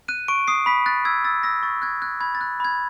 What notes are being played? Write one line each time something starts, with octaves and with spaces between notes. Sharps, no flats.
F#6 D#7
C#6 D7
D#6 C7
B5 B6
F#6 A6
E6 G#6
E6 A6
E6 A#6
C#6 A6
F#6 G#6
F#6 G#6
B5 G#6
A6
F#6
B5 G#6